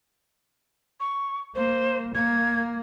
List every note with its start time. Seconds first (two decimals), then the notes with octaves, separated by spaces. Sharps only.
1.00 C#6
1.55 A#3 C5
2.15 A#3 G#6